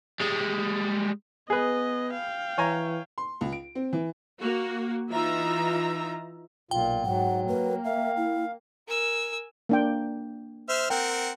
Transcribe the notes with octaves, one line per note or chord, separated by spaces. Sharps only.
G3 G#3
B3 G#4 B4 D#5
F5 G5
E3 C#5 G#5 A#5
C6
C#2
D7
C4
E3
A#3 F#4
E3 D#4 F4 E5 A#5
B1 A#2 F4 G5
G#2 F#3 F#5
A#3 B4
E5 F5
E4
A#4 G#5 E6
A#3 D4 G5
C5 E5 F6
C4 A#4 F#5 G5